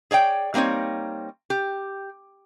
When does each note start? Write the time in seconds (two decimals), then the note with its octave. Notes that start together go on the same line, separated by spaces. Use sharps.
0.11 G#4 C#5 D5 G5
0.54 G3 A#3 C4 D#4 C#5
1.50 G4